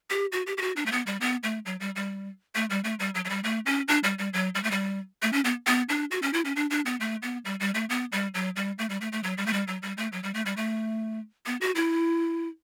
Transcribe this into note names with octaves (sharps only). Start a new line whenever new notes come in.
G4
F#4
G4
G4
F#4
D4
A3
B3
G3
B3
A3
F#3
G3
G3
A3
G3
A3
G3
F#3
F#3
G3
A3
C#4
D4
G3
G3
F#3
G3
A3
G3
A3
C#4
B3
B3
D4
F#4
C#4
E4
C#4
D4
D4
B3
A3
B3
G3
G3
A3
B3
G3
F#3
G3
A3
G3
A3
A3
F#3
G3
A3
G3
F#3
G3
A3
F#3
G3
A3
G3
A3
B3
F#4
E4